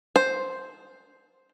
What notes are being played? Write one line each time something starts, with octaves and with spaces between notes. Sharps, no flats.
C5